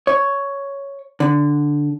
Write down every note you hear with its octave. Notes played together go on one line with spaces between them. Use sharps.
C#5
D3